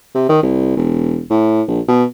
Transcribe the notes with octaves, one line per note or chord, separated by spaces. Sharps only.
C3
D#3
C2
E1
A2
A#1
B2